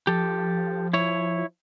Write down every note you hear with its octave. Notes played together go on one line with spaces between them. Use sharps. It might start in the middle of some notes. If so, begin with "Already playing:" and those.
F3 G4 A4
E4 C#5